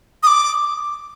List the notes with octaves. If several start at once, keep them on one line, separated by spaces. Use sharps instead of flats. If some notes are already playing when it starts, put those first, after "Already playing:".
D#6
D6